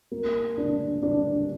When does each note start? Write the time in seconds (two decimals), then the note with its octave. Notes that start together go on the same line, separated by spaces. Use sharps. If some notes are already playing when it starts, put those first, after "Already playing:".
0.12 A#3
0.58 D4
1.03 D4